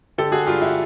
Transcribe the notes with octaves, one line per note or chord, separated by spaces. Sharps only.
D3 G4 A4
F#4 G#4
G2 F4 G4
E4 F#4